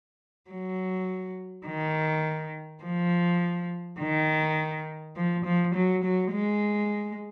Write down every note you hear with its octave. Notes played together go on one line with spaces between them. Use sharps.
F#3
D#3
F3
D#3
F3
F3
F#3
F#3
G#3